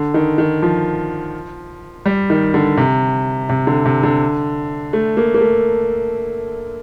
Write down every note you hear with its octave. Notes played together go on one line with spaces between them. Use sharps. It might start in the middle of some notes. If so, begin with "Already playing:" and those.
Already playing: D3
D#3
D#3
F3
G3
D#3
D3
C3
C3
D3
C3
D3
A3
A#3
A#3
A3